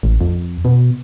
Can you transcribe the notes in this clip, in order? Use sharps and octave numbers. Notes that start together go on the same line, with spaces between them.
A1
F2
B2